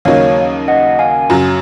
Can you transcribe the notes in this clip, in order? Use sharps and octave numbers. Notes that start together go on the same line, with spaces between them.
D#2 C#3 F#3 A#3 D#4 C#5 F5
D#5 F#5
F5 G#5
F#2 C#3 F#3